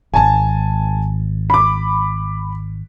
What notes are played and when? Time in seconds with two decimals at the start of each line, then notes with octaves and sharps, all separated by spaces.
0.14 D#1 G#1 G#5 A5
1.50 B5 D6